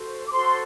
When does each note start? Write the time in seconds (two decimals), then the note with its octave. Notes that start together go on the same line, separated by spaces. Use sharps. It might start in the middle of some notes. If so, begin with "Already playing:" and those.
Already playing: F#4 A4 C5
0.25 D6
0.32 F#4 A4 C5 C6